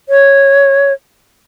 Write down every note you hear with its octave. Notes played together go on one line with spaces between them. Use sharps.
C#5